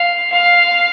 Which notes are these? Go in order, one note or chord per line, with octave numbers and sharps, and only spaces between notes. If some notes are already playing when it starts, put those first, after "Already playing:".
Already playing: F5
F5